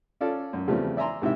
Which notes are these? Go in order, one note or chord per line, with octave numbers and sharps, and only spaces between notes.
C#4 F4 A4 D5
F#2
E2 C#3 F3 G3 A3 C4
D5 E5 G#5 A#5 C6
G#2 C3 E4 E5